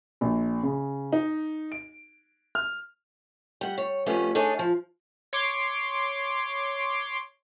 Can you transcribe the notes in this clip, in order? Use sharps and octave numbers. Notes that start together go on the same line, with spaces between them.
A#1
C#3
D#4
D7
F6
G3 F#5
C#5
F2 G3 A3 B3 C#4
D4 D#4 G#4 A4 C#5
F3
C#5 C6 D6 D7